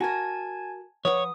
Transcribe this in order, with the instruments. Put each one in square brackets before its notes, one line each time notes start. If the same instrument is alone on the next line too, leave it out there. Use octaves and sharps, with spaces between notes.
[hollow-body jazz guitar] F#4 A#4 [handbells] G#5 A5 G#6
[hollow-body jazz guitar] F3 B4 F#5 [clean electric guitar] C#5 [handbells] D#6